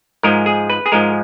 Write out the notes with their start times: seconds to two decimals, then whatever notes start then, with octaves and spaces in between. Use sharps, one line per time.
0.23 G#2 F3 G#3 A#4
0.46 G#4
0.70 B4
0.86 G#4
0.92 G#2 F3 G#3 A#4